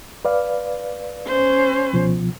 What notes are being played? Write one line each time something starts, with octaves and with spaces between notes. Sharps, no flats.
B4 D5 F5
C#4 C5
C#2 B2 F3